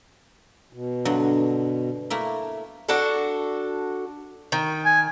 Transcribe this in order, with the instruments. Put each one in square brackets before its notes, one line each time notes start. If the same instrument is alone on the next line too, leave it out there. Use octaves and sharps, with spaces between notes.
[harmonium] B2
[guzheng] G2 D3 F#3
A3 A#3 E4
[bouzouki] D4 F#4 A4
D#3
[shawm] G#5